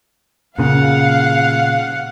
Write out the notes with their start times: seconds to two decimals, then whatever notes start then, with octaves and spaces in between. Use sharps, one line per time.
0.58 A#2 C#3 F5 F#5